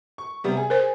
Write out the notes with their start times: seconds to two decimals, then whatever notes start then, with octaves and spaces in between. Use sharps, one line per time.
0.18 C#6
0.44 C3 G3 B3
0.57 G#4
0.70 A#4 C5